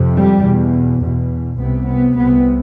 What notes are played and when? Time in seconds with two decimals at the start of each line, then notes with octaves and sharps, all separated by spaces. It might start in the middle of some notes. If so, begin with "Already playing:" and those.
Already playing: F2 C3
0.15 G3
0.43 E2 B2
1.01 E2 B2
1.58 C2 C3 B3
1.86 B3
2.15 C2 C3 B3